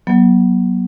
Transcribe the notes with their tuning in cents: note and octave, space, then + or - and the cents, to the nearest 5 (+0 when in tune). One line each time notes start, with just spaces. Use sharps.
F#3 +10 B3 -45